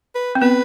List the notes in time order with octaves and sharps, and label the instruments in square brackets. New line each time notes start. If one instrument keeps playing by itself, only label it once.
[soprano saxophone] B4
[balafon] C4
[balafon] B3 [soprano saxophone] B4